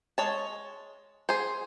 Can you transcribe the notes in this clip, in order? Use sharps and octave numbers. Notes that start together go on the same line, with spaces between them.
G#3 C#5 A5
G#4 C5